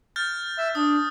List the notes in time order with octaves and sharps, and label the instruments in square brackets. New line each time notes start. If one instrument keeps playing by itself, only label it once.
[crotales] F6 G6 A6
[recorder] E5
[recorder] D4 [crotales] D#6